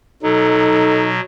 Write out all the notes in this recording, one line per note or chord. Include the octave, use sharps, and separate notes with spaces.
B2 F#3 D#4 A4